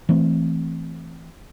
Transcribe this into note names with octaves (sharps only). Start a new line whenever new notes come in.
E3 A3 C4